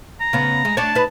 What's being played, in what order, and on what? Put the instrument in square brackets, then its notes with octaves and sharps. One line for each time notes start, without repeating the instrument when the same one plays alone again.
[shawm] A#5
[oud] C#3 B3
G#3
[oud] D4 C#5 [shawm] A5
[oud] D#4 B4